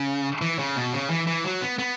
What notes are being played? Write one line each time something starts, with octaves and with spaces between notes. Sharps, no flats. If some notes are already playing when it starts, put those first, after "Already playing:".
Already playing: C#3
E3
C#3
B2
C#3
E3
E3
F#3
B3
B3